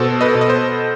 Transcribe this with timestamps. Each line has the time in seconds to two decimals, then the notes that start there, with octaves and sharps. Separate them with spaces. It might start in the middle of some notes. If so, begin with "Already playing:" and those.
Already playing: B2 A4 C5
0.21 B4 D#5
0.35 B2
0.41 D#5
0.50 C5